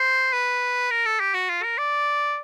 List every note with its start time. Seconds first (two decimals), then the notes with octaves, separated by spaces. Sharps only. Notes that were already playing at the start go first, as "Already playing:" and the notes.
Already playing: C5
0.32 B4
0.91 A#4
1.05 A4
1.20 G4
1.34 F#4
1.49 F4
1.63 A#4
1.78 D5